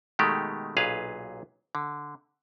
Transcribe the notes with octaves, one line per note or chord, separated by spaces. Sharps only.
B2 D#3 G#3 A3 G4
B1 A#2 G#4 B4 F5
D3